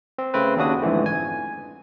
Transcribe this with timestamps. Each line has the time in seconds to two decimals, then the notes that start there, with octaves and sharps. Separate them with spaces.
0.18 C4
0.34 C#3 A3 C4 B4
0.56 D#2 C#3 D4 F#4 D#6
0.82 F2 G#2 D3 E3 A3
1.06 G#5